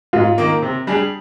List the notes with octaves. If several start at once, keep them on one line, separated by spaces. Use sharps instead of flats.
G#2 F4
D#3 A#3
C3
G3 D4 G#4